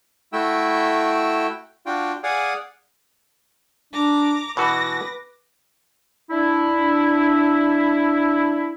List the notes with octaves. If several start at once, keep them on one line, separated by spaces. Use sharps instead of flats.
A3 E4 F#4 G5 E6
D4 F4 F#4 G5
G#4 D5 F5 F#5 G#5 D#6
D4 A#5 D6
B2 E3 F#4 B4 D6 A#6
D4 E4